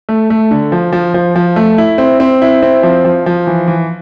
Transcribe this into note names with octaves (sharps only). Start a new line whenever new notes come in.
A3
A3
D3
F3
F3
F3
F3
A3
E4
C4
C4
E4
C4
F3
F3
F3
E3
E3